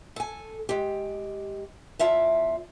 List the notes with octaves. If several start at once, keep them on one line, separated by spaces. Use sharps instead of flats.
A4 G#5
G#3 G4
E2 F4 E5 A5